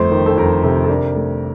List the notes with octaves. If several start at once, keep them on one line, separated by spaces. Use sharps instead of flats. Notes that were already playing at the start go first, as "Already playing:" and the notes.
Already playing: G1 F2 A3 C5
D#3
A4
F2 A#4
C3 A4
A4
D4 A#4
A3